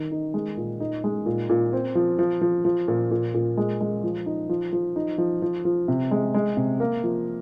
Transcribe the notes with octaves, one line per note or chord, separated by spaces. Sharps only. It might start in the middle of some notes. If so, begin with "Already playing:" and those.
Already playing: D#3
D#4
G#3
A#2
D#4
G#3
A#2
A#2
C4
F3
F3
F3
F3
A#2
A#2
A#2
G#3
G#3
F3
D#4
F3
F3
D#4
F3
F3
F3
C3
G#3
G#3
C3
A#3
F3